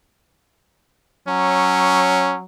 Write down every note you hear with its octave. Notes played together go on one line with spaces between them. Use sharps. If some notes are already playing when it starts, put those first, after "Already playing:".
F#3 C#4